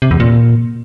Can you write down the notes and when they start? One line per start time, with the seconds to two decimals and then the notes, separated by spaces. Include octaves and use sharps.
0.02 C3
0.11 E2
0.20 A#2